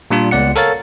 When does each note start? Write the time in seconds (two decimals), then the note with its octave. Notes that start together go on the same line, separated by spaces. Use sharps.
0.11 A#2 G3 D4 F4
0.31 C#2 B3 D5 F#5 C#7
0.56 A4 A#4 C#5 F5 A6